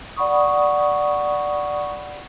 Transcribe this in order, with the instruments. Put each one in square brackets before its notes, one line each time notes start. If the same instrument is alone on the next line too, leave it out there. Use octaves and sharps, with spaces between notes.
[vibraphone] D5 F#5 B5 C#6 D#6